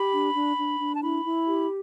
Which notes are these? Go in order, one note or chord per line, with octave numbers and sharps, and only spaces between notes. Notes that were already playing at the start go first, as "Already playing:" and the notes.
Already playing: G4 B5
D4
D4
D4
D4
A5
E4 B5
E4
G4